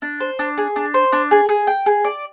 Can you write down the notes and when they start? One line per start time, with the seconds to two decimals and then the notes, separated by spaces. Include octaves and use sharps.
0.02 D4
0.20 C5
0.39 D4
0.58 G#4
0.76 D4
0.94 C5
1.12 D4
1.31 G#4
1.49 G#4
1.67 G5
1.86 G#4
2.04 D5